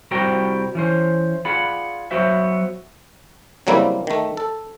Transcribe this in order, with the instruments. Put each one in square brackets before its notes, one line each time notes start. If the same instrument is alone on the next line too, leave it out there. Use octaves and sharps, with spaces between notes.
[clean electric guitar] C2 G3 F#4 C5 G5 A#5
E3 C#4 C5
F4 G#4 D5 F#5 B5
F#3 B3 F#4 C5 E5
[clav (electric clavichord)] C#3 F#3 G3 A#3 C4 E4
D#3 A3
A4